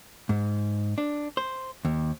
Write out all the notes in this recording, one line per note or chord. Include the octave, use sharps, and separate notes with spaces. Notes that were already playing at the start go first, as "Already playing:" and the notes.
G#2
D4
C5
D#2